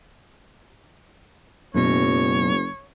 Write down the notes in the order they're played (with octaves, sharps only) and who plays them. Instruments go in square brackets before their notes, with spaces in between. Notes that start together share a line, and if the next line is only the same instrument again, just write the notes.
[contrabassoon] F#1 [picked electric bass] F#2 B2 [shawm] C#5